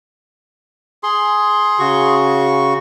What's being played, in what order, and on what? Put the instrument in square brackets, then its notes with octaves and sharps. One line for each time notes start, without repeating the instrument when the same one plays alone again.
[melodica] G#4 C6
[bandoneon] C#3 F#4 C#6